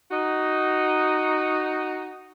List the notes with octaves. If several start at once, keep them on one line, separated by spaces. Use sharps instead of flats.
D#4 F#4